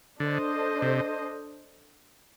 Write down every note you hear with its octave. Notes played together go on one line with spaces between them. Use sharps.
D3 D4 A4 C5 D#5
C3